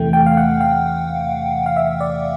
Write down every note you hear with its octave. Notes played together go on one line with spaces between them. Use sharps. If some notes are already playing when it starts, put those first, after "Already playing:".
Already playing: E2 C3 E3 A3 G5
G5
F5
F#5
F5
F5
E5
D5